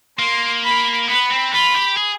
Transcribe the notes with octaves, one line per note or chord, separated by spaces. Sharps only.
A#3 C6
B5
B3 B5
C4
F4 B5
G4
G#4